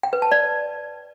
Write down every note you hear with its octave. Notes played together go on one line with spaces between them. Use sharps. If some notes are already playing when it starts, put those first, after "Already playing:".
G5
B4
A5
D5